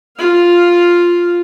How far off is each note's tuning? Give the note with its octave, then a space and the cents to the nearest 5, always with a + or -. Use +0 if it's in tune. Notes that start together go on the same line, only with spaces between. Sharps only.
F4 +0 F5 +0